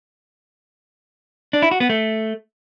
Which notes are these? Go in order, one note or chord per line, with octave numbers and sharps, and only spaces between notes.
D4
E4
F#4
B3
A3